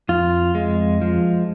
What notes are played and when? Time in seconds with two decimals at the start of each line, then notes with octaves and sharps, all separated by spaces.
0.09 F2 F4
0.55 G#3
1.01 F3